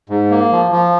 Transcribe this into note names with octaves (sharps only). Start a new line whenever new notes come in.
G#2
A#3
F3
F3